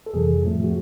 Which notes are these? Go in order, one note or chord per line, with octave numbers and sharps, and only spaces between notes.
A4
F2 C3 E3 G3 G#4
A2 F3 A3
F#4